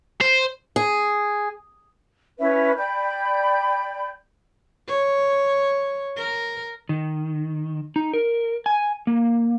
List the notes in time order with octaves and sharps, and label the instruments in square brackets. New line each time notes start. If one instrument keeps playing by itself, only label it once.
[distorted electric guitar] C5
[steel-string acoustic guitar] G#4
[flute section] C#4 E4 B4 E5
D5 G5 B5 G6
[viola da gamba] C#5
A#4
[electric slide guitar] D#3
D#4
A#4
G#5
A#3